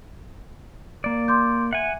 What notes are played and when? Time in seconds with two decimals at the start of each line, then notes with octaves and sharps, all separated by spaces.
1.04 A#3 D5
1.28 C6 D6 G6
1.73 E5 F#5 G#5